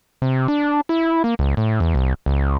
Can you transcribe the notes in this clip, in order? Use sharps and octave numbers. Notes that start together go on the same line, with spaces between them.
C3
D4
E4
A#3
C#2
A2
E2
C2
C#2